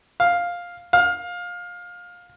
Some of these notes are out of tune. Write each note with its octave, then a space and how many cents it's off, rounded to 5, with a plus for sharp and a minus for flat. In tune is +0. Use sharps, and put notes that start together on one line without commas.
F5 +5
F5 +20